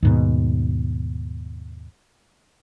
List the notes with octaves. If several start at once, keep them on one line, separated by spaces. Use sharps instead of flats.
D#2 G#2 B2